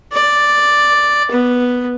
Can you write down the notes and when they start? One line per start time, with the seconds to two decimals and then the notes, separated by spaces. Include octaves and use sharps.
0.13 D5
1.31 B3